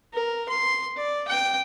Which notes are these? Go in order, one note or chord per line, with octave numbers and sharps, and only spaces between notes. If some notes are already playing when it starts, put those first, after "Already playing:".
A#4
C6
D5
G5